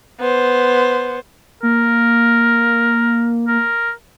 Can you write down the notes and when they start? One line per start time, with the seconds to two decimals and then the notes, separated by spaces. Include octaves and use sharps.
0.19 B3 C5
1.63 A#3 A#4
3.48 A#4